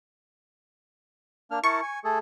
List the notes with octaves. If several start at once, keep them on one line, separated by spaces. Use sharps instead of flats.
A#3 D4 F6
E4 A#4 A5 C#6
G#5
A3 G#4 A4